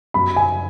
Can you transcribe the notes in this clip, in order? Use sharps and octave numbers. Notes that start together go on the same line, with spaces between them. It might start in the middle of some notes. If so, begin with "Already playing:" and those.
F#2 B5
G#5